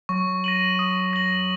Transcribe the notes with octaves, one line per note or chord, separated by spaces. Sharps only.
F#3 C#6
A#6 D#7 F#7
D#6
A#6 F#7